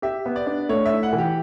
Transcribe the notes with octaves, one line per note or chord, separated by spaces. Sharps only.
G4 E5
B3
D5
D4
A3 C#5
E5
E4
F#5
E3
G4